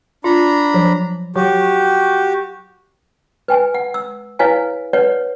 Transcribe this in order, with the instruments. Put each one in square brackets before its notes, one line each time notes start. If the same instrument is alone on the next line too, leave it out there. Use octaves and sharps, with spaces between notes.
[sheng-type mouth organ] D4 A#5 B5 [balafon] F4
[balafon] F3 F#3
[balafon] F#3 [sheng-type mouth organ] F#4 G4
[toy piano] B4 G5 G#5
F#5
E6
E4 B4 C#5 F5 G#5
B4 C#5 D5 F#5